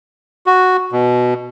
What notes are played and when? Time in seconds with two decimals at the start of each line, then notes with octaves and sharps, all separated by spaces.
0.46 F#4
0.92 B2